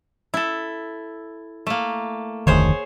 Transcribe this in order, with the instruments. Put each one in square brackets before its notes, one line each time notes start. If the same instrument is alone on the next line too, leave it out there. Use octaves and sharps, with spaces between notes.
[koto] E4 A4
A3 A#3
[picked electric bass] F1 D2 D#3 [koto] G#4 C5 C#5